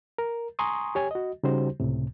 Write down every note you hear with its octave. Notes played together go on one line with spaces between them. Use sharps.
A#4
G#5 A#5 C6 C#6 D#6
G4 C#5 G#5
F#4 D#5
C#3 G3 D#4 F#4 G4 C5
C#2 A2 C3